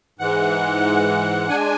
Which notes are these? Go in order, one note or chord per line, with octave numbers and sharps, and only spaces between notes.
G#2 E3 G#3 F#5
G#3 D4 G#5